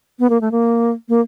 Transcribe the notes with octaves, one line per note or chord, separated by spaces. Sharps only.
B3
A#3
A3
A#3
A#3